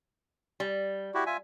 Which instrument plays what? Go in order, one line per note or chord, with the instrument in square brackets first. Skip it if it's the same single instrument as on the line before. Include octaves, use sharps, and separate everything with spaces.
[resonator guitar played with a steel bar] G3
[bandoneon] E4 F#4 G4
F4 E5 G#5